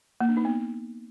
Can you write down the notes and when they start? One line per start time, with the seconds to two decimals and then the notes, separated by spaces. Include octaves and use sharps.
0.21 A#3
0.29 D4
0.37 D#4
0.45 B3